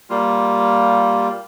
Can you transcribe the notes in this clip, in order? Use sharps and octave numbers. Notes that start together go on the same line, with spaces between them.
G3 A#3 F4